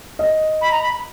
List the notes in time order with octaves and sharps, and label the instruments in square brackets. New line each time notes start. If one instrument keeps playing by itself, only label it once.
[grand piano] D#5
[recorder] B5
A#5
B5